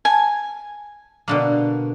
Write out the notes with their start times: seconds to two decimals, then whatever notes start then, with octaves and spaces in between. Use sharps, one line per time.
0.05 G#5
1.28 B2 D3 A#3